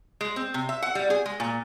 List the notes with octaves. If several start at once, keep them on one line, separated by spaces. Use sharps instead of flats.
G#3
C4
C3
E5
F#5
G3
G#4
G#3
A#2